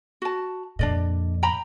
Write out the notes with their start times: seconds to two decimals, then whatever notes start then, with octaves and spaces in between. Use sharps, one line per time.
0.22 F#4 A5
0.79 F2 A#2 D4 D5 D#5
1.43 G5 A#5 B5